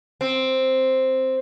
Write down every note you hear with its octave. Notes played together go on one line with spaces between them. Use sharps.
C4